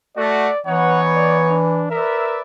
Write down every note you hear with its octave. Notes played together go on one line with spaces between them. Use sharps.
A3 F#4 D5
E3 B3 D#4 C#5 F#5
D5
D4
A#4 B4 D5 E5